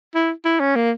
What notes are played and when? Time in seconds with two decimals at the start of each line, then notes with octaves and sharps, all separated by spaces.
0.15 E4
0.45 E4
0.60 C#4
0.76 A#3